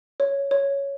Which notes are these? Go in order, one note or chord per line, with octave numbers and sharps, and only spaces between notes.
C#5
C#5